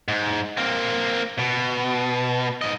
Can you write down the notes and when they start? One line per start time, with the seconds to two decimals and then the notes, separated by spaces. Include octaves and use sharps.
0.08 G#2
0.57 A#3 C4
1.39 B2
2.62 G#2 D#5